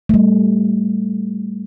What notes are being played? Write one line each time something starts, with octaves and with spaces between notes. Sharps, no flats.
G3 A3